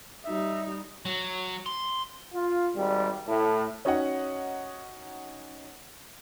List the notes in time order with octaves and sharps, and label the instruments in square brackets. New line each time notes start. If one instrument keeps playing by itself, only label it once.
[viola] G3 D#4 [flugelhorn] E5
[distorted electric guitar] F#3
C6
[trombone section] F4
G#1 G3
A2
[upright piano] C#4 D#4 F#4 C#5 D#5 F#5